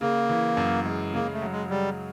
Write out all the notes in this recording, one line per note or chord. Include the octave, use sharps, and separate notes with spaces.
C#3 A#3
E3
F#2
G#3
C#3 A#3
A3
F#3
G#3
C#3 G3